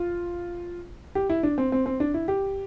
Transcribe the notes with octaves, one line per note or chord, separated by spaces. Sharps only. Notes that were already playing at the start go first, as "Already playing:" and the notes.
Already playing: F4
G4
E4
D4
C4
C4
C4
D4
E4
G4